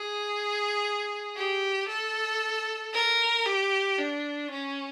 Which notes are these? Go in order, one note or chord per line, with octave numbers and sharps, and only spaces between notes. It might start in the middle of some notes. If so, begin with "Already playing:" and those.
Already playing: G#4
G4
A4
A#4
G4
D4
C#4